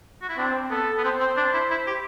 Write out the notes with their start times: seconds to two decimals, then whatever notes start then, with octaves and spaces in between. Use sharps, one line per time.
0.22 F#4
0.29 E4
0.37 C4 D4
0.70 B3 A4
0.98 B3
1.04 C4 C5
1.20 C4
1.37 D4
1.53 E4
1.71 E4
1.87 G4